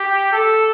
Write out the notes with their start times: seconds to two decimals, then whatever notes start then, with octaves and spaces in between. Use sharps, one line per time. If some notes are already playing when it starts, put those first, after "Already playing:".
Already playing: G4
0.32 A4